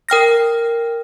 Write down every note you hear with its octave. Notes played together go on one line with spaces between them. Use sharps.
A#4 G5 F6 A#6